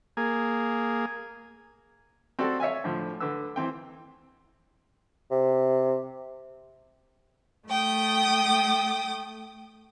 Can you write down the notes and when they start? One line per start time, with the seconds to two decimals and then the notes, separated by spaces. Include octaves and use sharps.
0.17 A#3 G#4
2.39 C4 F#4 G4 A4 D5
2.60 C#5 E5 F5 G#5
2.84 A2 D3 F3
3.20 D3 B4 E6
3.56 E3 C4 G5
5.31 C3
7.67 A3 G5 D#6